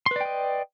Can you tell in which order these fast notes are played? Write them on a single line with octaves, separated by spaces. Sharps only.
C6 B4 D5 G5 D#5